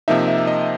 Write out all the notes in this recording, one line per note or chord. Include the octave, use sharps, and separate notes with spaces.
C3 F3 A#3 D#4 E5
E5
E5
D#5